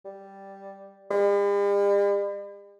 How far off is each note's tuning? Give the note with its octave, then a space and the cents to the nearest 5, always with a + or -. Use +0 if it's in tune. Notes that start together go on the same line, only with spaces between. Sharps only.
G3 +0
G3 +45